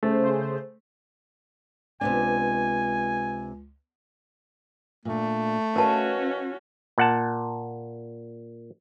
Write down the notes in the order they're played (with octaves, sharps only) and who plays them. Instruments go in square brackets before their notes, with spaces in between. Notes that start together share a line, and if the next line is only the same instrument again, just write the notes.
[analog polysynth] C#3 G#4 C5 [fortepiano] A3
[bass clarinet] C#2 [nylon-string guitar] C3 B3 D4 [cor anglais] G#5
[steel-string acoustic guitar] A#2 D4 [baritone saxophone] A3
[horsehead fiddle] C#4 F#4 [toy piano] A#4 A5 [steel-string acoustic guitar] B4 D#5 F5
[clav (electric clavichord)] A#2 F#5 A5